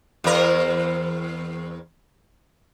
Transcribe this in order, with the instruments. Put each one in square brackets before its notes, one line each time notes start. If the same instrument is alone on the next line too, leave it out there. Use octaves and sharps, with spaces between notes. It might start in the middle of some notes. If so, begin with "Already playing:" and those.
[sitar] E2 C4 A#4